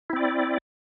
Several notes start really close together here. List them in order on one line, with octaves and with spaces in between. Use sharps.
E4 C4 D5